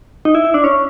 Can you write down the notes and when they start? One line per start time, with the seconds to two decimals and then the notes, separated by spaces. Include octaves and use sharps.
0.25 D#4
0.35 E4
0.45 E4
0.54 D4
0.64 C#4